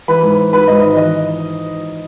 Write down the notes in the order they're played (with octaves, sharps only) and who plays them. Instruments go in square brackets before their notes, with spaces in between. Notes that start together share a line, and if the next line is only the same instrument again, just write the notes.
[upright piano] E3 B4
G#2
G#2
G#2 B4
G#2 D#5
D#3 D#5
E3 D#5